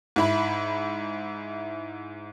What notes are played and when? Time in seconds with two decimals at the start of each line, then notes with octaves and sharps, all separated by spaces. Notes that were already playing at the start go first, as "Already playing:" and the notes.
0.16 G#2 E4 B5